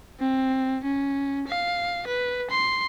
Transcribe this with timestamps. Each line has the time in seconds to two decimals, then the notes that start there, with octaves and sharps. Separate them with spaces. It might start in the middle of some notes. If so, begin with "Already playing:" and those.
0.20 C4
0.84 C#4
1.48 F5
2.07 B4
2.51 C6